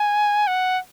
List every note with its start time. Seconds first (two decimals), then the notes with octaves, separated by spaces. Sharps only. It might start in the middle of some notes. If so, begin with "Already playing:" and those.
Already playing: G#5
0.47 F#5